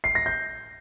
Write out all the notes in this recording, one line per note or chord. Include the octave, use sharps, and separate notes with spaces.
C7
A#6
G6